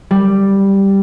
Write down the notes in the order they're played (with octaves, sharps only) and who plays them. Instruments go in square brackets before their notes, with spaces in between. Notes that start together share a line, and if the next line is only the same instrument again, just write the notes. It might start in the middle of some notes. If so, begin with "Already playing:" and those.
[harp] G3